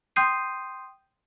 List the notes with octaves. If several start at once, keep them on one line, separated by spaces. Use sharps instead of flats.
G5 C6 D#6 G6 C7 D#7